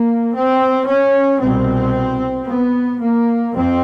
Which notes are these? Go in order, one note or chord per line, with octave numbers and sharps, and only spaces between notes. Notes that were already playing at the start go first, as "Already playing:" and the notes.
Already playing: A#3
C4
C#4
C2 B2 C4
B3
A#3
F2 C4